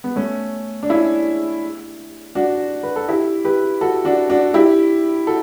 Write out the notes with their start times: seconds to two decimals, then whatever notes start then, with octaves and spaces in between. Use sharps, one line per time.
0.04 B3
0.16 A3 C#4
0.83 D4
0.90 C#4 E4
2.35 D4 F#4
2.83 B4
2.96 A4
3.08 E4 G4
3.44 G4 B4
3.81 F#4 A4
4.05 D4 F#4
4.30 D4 F#4
4.54 E4 G4
5.27 F#4 A4